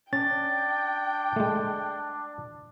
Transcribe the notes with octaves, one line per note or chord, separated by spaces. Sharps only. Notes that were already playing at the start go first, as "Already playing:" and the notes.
C#4 D4 G5 A6
G#3 A3